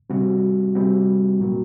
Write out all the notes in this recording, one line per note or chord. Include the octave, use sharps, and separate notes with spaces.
C3 G3 C4 F#4
C3 G3 C4 F#4
A#2 F#3 A#3 F#4